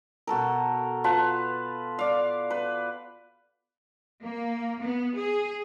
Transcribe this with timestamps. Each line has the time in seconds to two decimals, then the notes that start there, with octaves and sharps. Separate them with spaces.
0.27 B2 F#4 A4 A#4
1.04 F4 B4 A5
1.99 D5 F5
2.50 B4
4.22 A#3
4.81 B3
5.16 G#4